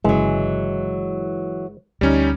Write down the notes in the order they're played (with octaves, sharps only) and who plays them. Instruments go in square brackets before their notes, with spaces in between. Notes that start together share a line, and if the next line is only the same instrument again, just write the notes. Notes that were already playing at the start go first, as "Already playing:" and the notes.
[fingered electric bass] G1 C#3 C#4 [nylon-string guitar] E3 F#3 [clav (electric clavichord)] G#3
[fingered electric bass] D2 D3 [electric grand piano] G3 C#4 D#4